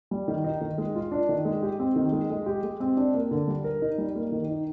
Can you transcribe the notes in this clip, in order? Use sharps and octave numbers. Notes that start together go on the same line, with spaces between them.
G3
D#3
D#4
D#3
G#3
F4
D4
D#3
G#3
G4
C4
D#3
G#3
G#3
G4
G#3
C4
D4
A#3
D3
G3
A#4
D#4
G3
A#3
D#3
D#4